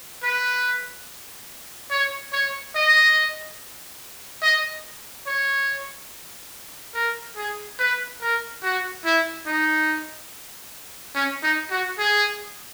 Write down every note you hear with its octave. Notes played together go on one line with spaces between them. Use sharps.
B4
C#5
C#5
D#5
D#5
C#5
A#4
G#4
B4
A#4
F#4
E4
D#4
C#4
D#4
F#4
G#4